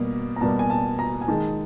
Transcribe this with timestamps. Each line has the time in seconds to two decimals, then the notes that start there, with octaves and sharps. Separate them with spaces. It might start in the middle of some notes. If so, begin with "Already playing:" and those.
Already playing: B2 G3 A#3
0.36 A#5
0.41 B2 G3 A#3 A5
0.59 G#5
0.70 A5
0.99 A#5
1.22 G#5
1.28 D#3 G#3 A5